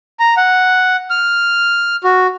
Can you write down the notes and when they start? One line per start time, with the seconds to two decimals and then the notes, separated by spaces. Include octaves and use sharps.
0.20 A#5
0.37 F#5
1.10 F6
2.04 F#4